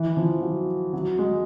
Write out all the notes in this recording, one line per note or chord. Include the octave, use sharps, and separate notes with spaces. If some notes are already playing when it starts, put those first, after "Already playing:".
Already playing: E3
F3
F#3
F#3
G#3